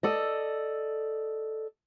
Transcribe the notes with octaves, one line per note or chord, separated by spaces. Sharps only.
A4 D5 D#5